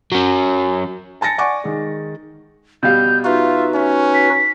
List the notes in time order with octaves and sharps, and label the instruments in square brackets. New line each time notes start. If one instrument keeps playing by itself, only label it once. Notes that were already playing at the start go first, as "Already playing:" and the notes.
[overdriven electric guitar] F#3 C#4
[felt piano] G#5 A5 A6 A#6 C#7
D5 F#5 G#5 C#6 D6
D#3 G#3
[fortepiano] B2 G3 F5 [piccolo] G6
[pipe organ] D#4 F#4 B4 [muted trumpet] F4 [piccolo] E5
[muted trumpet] C#4
[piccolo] B6